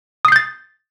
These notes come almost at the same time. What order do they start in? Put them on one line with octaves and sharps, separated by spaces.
D#6 C7 G6 A6